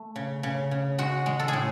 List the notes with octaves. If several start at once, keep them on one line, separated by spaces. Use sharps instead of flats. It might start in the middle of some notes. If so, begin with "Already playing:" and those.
Already playing: A3
C#3
C#3
C#3
G#3 F#4
G#3
A4
G#4
A2